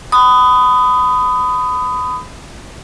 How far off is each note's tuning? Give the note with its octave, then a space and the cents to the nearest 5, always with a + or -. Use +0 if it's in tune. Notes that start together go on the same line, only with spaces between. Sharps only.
B5 +30 D#6 +0